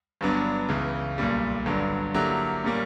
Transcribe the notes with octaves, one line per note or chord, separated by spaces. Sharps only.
G1 G2 F#3 B3 D4
C#2 C#3 E3
B1 A#2 G3
G1 G2 D3 F#3
D3 F#3 A#3 E4 G4
A#2 G3 A#3 C#4